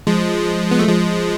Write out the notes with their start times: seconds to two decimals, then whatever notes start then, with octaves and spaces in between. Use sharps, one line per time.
0.07 F3 G#3
0.71 B3
0.79 A3
0.88 F3 G#3